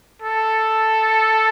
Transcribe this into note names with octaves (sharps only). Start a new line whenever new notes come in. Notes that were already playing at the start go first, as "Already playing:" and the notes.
A4